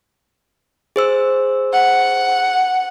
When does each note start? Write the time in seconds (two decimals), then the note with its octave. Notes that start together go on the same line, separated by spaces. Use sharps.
0.96 G#4 C5 E6
1.72 F#5